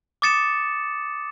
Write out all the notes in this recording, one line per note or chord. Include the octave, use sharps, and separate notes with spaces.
D6 D#6 A6 C#7 E7